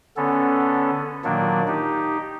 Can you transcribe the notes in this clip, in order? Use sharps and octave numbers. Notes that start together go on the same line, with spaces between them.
D3 B3 C#4 A4
A#2 D#3 F#3 A#3 D4
D#4 G4